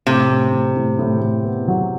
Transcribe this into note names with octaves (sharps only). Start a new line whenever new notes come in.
A2 C3
A2
A2
A2
A2
A2
B3
F#3